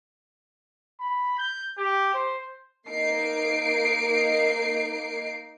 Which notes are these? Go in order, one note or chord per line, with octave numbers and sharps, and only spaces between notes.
B5
G6
G4
C5
A#3 D#4 C7 D7